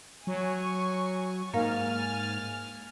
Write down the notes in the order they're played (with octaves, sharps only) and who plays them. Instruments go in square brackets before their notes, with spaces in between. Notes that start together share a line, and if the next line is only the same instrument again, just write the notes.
[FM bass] F#3 [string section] G#5 C#6
[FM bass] G#2 [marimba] A#3 A#4 F5 [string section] G#5 F6 A6